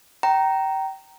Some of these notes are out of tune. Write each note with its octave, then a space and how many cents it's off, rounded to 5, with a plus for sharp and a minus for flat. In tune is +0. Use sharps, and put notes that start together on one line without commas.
G5 -25 A#5 +0